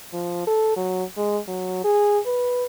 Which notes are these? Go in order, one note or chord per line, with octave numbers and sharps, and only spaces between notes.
F3
A4
F#3
G#3
F#3
G#4
B4